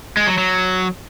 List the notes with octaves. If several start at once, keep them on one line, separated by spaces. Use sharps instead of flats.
G#3
F#3
F#3